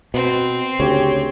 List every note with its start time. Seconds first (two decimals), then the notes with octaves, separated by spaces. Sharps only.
0.14 B2 C4
0.80 D2 C#3 G4 C#5